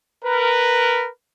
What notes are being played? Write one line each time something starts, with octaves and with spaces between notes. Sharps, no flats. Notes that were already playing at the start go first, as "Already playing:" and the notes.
A#4 B4